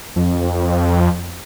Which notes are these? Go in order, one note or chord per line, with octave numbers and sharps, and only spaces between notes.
F2